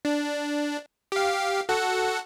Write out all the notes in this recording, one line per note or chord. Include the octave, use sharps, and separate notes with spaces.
D4
G4 F5
F#4 A4 F#5